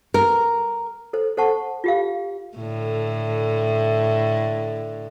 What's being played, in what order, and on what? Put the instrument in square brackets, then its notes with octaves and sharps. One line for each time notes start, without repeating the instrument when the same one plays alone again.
[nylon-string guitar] A#4
[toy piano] A4 C5
A4 C5 F#5 A5 C#6
F4 G4 F5
[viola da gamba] A2 D3